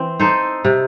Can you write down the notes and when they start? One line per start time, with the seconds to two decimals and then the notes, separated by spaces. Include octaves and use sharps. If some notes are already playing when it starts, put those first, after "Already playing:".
Already playing: E3 C4
0.20 D#4 A4 C5
0.65 C3